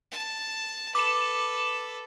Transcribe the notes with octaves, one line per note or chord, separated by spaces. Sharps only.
A5
A4 B4 D6 E7